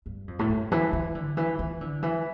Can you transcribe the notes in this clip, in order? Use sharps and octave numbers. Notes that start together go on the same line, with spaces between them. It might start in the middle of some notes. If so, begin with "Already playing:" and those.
G2
F2
A2
G2
E3
E3
D3
E3
E3
D3
E3